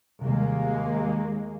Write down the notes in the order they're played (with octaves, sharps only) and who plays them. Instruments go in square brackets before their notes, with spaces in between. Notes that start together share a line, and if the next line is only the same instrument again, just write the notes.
[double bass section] D#2 G#3 A#3 [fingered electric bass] C3 G3